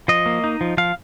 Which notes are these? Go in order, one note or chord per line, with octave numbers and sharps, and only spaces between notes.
F3 D#5
A#3
D#4
F3
F3 F5